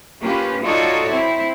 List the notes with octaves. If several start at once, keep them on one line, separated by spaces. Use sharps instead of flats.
A#3 C#4 F4 G4 B4
D#4 F4 F#4 A4 C#5 D5
C4 E4